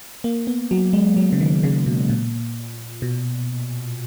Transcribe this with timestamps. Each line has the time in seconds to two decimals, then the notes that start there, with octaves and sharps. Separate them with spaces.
0.24 A#3
0.47 B3
0.71 F#3
0.93 G#3
1.17 F#3
1.32 C#3
1.40 D#3
1.63 C#3
1.86 B2
2.10 A#2
3.02 B2